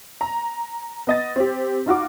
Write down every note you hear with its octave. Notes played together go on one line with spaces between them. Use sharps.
A#5
B3 D#5 A6
C4 G4
D#4 F4 F#4 D6